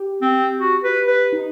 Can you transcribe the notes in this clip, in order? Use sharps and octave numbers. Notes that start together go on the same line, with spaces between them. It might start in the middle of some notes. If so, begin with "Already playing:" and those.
Already playing: G4
C4
F#4
B4
B4
D#4